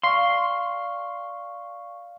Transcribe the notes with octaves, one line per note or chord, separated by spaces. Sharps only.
D5 F5 C6 C#6 C7